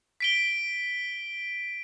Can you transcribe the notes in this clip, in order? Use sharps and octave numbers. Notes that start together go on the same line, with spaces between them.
B6 D7 G7